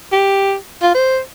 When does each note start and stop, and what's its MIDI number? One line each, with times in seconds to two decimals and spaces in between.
0.12 0.55 67
0.82 0.94 65
0.94 1.19 72